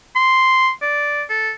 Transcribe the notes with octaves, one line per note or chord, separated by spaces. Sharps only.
C6
D5
A4